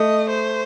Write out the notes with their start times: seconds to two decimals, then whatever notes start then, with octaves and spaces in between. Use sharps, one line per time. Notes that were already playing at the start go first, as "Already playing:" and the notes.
Already playing: A3 D#5
0.29 C5